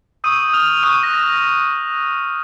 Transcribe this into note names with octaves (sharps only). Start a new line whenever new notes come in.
C#6 D#6 E6 G6 D#7
F6 F7
C#6 D#6 F#6 D#7
A#6
A#6